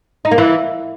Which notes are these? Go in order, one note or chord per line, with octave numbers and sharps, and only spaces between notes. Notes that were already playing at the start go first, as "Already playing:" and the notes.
D#4
A#3
E3